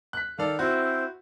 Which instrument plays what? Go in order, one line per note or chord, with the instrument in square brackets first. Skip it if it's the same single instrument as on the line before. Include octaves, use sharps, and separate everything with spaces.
[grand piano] F#6 B6
[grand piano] D#3 D5 [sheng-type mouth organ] A4 F5
[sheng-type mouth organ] C4 E4 C5 [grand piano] F#4